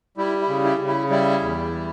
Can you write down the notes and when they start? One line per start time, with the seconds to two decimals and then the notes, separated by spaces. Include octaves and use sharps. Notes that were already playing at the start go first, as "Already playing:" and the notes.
0.17 G3 E4
0.41 E4
0.48 C#3
0.64 E4
0.80 C#3
0.87 E4
1.10 G3 E4
1.42 E2
1.72 G3